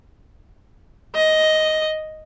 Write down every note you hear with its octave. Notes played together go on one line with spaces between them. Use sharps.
D#5